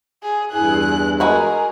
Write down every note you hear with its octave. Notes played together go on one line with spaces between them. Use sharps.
G#4
E2 G2 E4 G#4 F#6
G#3 F#4 G#4 A#4 B5